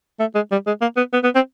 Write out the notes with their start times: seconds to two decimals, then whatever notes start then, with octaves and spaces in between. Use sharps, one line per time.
0.20 A3
0.35 G#3
0.51 G3
0.67 G#3
0.81 A#3
0.97 B3
1.13 B3
1.24 B3
1.35 C4